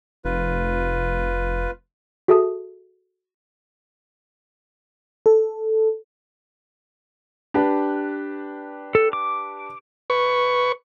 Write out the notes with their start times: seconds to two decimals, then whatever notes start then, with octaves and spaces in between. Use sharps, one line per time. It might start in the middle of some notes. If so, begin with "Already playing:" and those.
0.25 F1 F4 B4
2.28 F#4 G#4 A4 E5 A5 D#6
5.26 A4
7.54 D4 G4 B4
8.95 A4
9.13 D6
10.10 B4 C#6